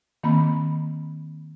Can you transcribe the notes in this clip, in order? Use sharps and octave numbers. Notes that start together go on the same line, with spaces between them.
D#3 A#3 C4 B5